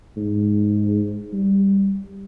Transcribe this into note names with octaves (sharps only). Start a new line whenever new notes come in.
G#2
G3